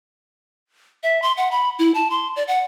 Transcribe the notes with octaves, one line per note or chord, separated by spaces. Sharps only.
E5
C6
F#5
B5
E4
A5
C6
D5
F#5